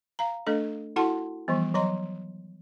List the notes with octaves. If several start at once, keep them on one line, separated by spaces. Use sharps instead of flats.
F5 A#5
A3 D4 A4 D#5
E4 F#4 A4 F#5 A5 C6
E3 F3 G3 B3
F#3 D#5 A#5 C6